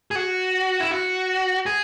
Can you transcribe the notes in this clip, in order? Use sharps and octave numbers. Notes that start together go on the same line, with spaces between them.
G#4
F#4
E4
F#4
G#4